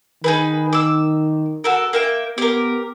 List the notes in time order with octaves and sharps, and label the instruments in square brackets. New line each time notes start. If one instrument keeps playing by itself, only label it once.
[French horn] D#3 [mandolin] D#4 G#4 B4
[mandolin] D6 E6
F#4 A4 A#4
A#3 E5 G5
[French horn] B3 [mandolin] G4 A#4